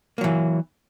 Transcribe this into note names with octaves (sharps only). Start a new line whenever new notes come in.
E3 F#3 A#3